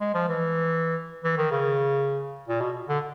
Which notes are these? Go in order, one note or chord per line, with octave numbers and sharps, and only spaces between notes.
G#3
F3
E3
E3
D#3
C#3
A#2
B2
D3